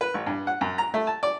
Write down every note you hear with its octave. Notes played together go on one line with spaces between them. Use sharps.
B4
A1
G2
F#5
F#2
A#5
A3
A5
D5